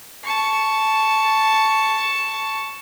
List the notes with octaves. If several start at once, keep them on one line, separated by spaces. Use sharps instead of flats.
A5 C#6